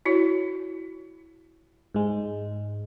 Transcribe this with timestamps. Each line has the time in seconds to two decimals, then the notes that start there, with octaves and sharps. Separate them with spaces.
0.06 E4 F#4 C#5
1.95 G#2 G#3